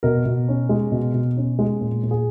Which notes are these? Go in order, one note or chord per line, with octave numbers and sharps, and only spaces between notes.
B2 A#4
B2
C#4
G#3
B2
B2
C#4
G#3
A#2
A#2
G#4